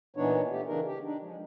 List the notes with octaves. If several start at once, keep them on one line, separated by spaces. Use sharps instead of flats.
A#2 E3 B3 D4 D#4 C#5
A3 B3 G4
C#3 E3 D4 D#4 A#4
G4
D4 D#4
F3 G#3